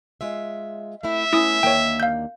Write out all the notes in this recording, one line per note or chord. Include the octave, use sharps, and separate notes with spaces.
G#3 F4 E5
A3 C4 E4 E5
A3 B3 C#4 E4 D#6
D#2 D3 A#3 C#5 G5
F5 G6